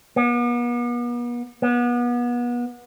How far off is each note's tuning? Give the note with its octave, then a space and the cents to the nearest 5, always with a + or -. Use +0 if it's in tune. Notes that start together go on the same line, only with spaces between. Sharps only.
B3 -40
B3 -30